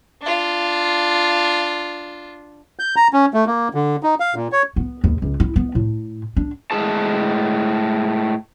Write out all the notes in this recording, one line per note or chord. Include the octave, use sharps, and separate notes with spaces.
D4 F4
G6
A#5
C#4
A3
A#3
D3
D#4
F5
A#2
C#5
B3
D#2
C#2
E4
B3
A2
D4
A2 G#3 E4 G#4 A5